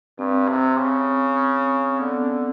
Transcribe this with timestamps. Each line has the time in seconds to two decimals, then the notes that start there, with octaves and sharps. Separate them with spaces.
0.19 G2 C4
0.49 C3
0.79 C#3
2.00 D3 B3
2.22 C#4